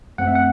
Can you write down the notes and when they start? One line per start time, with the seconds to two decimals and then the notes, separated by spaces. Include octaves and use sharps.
0.18 F#2 F#3 A3 C4 F#5
0.27 E5
0.35 F#5